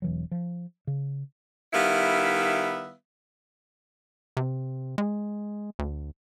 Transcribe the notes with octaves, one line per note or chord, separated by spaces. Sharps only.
E1 E3 F#3
F3
C#3
D#3 G3 B3 E4 E5 F5
C3
G#3
D2